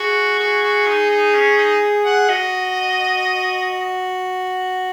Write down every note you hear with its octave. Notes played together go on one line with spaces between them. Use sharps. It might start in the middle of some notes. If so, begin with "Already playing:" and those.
Already playing: F#4 G#4
F#4 G#4
F#4
D#4
D#4
C#4
D#4
F#5
F#4 D#5